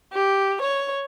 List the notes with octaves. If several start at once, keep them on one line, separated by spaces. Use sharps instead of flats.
G4
C#5